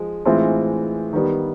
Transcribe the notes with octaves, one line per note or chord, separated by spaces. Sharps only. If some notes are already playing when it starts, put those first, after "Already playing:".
Already playing: F3 G#3
A2 E3 G#3 C4 F4
D#3 G3 B3